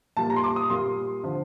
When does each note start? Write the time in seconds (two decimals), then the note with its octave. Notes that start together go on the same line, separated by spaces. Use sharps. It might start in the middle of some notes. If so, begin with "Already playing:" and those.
0.17 A#2 G3 A#3 A5
0.30 A#5
0.36 C6
0.44 D6
0.56 D#6
0.70 A#2 G3 A#3 C6
1.23 D3 F3